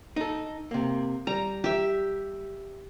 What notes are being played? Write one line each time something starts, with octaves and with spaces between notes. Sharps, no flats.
D#4 A4
C3 A#3
G3 A#5
G4 E5